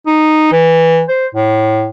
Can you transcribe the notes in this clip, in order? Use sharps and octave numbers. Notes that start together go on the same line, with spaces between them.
D#4
E3
C5
A2